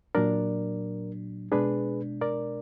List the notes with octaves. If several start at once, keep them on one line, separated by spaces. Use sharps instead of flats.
A#2 F#3 D4 A#4 D5
B2 G#3 D4 G#4 B4
A#4 D5